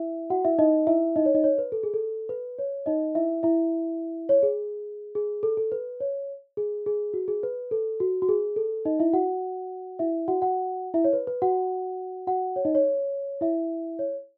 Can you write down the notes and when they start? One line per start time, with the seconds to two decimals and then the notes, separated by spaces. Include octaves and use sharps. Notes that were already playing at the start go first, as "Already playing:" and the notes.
Already playing: E4 E5
0.30 F#4 F#5
0.45 E4 E5
0.59 D#4 D#5
0.87 E4 E5
1.16 D#4 D#5
1.26 C#5
1.34 D#4 D#5
1.44 C#5
1.58 B4
1.72 A4
1.83 G#4
1.94 A4
2.29 B4
2.59 C#5
2.86 D#4 D#5
3.15 E4 E5
3.43 E4 E5
4.29 C#5
4.43 G#4
5.15 G#4
5.43 A4
5.57 A4
5.72 B4
6.00 C#5
6.57 G#4
6.86 G#4
7.14 F#4
7.28 G#4
7.43 B4
7.71 A4
8.00 F#4
8.22 F#4
8.29 G#4
8.56 A4
8.85 D#4 D#5
8.99 E4 E5
9.13 F#4 F#5
9.99 E4 E5
10.28 F#4 F#5
10.42 F#4 F#5
10.94 E4 E5
11.04 C#5
11.13 B4
11.27 B4
11.42 F#4 F#5
12.27 F#4 F#5
12.56 C#5
12.65 D#4 D#5
12.75 C#5
13.41 E4 E5
13.99 C#5